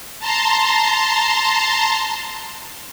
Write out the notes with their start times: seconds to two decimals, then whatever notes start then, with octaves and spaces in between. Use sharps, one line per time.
0.19 A5 A#5 C6